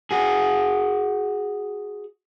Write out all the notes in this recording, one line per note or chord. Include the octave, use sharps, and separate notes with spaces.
F#4 G#4